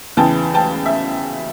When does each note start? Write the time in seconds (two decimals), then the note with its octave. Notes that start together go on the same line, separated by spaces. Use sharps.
0.17 E2 C#3 E3 G5 A5
0.54 G5 A5
0.86 E5